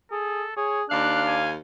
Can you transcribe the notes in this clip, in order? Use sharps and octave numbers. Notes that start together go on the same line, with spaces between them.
G#4 A4
G#4 C#5
D#2 D4 F5 F#6
G#5